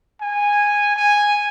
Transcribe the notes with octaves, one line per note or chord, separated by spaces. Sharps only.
G#5
G#5